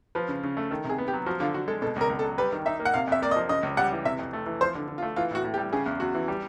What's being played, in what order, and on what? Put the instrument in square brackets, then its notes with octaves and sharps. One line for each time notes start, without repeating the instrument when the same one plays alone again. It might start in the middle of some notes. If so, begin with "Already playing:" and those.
[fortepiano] F3 [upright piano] B4
[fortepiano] C#3
C#3
A3
[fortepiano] D#3 [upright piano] A4
[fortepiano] C3
[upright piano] G#4
[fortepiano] B3
[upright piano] G4
[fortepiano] F#3
[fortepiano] F3 [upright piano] F#4
[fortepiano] D3 [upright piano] F4
[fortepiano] D3 [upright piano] F#4
[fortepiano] G#3 [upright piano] A4
[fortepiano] B2 [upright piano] A4
[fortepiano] C#2
[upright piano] A#4
[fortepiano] C#2
[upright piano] A4
[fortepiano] F#3
[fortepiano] G3 [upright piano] B4
[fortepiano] D#3
[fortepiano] D#4 [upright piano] E5
[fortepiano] A#3
[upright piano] F#5
[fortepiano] C3 [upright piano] F5
[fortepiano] F2 [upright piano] E5
[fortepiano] A#3 [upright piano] D5
[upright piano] D#5
[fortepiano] F3
[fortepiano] C#3 [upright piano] D#5
[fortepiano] C#2
[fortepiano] G3 [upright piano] F#5
[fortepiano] E3
[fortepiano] C3 [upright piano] E5
[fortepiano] F2
A3
E3
[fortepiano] F3 [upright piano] C5
[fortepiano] D3
D3
[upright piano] F4
[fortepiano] A3
[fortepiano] E3 [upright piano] F4
[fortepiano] A2 [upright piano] F#4
[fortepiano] A2
[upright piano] G4
[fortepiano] G3
[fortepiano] C#3 [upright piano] G#4
[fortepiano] E2
[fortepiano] E2 [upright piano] F#4
[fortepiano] E3
G3